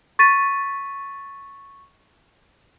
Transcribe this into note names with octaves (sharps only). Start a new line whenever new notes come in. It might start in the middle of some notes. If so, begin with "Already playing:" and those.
C#6 A6 B6 D#7